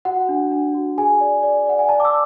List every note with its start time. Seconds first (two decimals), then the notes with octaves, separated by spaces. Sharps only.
0.05 F#4 F#5
0.29 D4
0.52 D4
0.74 F#4
0.98 G#4 G#5
1.21 D5
1.43 D5
1.66 D5 F#5
1.79 G#5
1.89 D5 A5
2.00 D6
2.05 E6